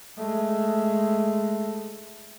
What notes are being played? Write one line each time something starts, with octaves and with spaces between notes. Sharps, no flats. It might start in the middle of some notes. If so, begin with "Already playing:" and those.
G#3 A3